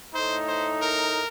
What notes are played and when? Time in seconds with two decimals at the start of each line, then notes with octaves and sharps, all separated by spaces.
0.15 A2 A3 D#4 C5
0.48 C5
0.81 A#4